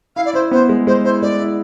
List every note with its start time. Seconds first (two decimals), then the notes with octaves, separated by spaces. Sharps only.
0.16 E4 F5
0.25 D5
0.34 E4 C5
0.51 B3 C5
0.69 G#3
0.87 G#3 C5
1.04 E4 C5
1.22 G#3 D5
1.39 E4